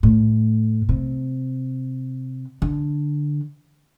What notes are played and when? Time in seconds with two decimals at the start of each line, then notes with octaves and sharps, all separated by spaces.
0.03 A2
0.89 C3
2.62 D3